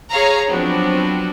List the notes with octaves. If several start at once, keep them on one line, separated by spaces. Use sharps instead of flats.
G#4 C#5 F5 A#5
F3 F#3 B3 C4 D4 F#4